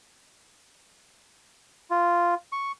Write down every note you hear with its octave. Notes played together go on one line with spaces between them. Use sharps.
F4
C#6